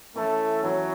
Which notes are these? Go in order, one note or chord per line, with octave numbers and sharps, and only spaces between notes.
E3 A3 C#4 E4
E3 F#3 C#4 E4